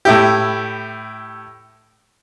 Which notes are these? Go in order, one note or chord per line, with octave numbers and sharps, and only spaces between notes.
A2 E4 G4